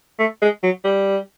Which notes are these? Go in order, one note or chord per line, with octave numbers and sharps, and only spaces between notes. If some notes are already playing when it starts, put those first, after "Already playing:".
A3
G#3
F#3
G3